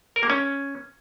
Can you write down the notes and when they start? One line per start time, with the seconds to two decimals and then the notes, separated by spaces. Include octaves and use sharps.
0.16 A#4
0.23 A#3
0.30 C#4